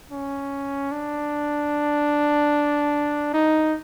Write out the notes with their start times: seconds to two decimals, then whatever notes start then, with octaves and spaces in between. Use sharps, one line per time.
0.11 C#4
0.92 D4
3.34 D#4